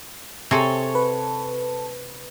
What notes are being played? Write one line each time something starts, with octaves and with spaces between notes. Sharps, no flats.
C3 C4 G#4 A4 C#5
B4